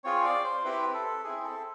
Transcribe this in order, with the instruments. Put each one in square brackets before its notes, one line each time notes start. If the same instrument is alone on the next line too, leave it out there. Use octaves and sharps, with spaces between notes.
[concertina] C4 F4 G#4 C#5
D5
C5
C4 E4 G4 B4
A4
C4 E4 G#4
A4